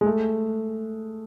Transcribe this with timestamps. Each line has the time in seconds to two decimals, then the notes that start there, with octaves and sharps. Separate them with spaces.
0.01 G#3
0.06 A3